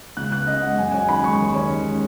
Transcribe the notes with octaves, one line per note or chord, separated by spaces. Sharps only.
C#2 F#6
B3 F#6
C#3 D#5
G#3 F#5
F#2 G#5
C#4 G#5
D#3 B5
G#3 C#6
D#2
C#4
D#3
G#3